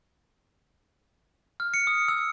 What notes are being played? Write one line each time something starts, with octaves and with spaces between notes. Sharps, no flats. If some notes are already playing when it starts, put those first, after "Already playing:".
F6
C#7
D#6
E6